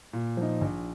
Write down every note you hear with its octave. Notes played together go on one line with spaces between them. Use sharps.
A#2
F3 D#4
A#1